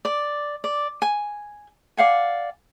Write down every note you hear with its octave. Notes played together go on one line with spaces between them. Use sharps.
D5 D6
D5
G#5
D5 F5 F#5 G#5